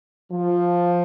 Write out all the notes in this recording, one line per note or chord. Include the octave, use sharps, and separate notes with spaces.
F3